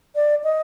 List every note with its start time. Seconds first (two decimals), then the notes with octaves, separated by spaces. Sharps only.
0.15 D5
0.44 D#5